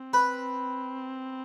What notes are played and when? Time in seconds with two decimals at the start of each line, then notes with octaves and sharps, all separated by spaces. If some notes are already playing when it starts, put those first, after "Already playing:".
Already playing: C4
0.13 B4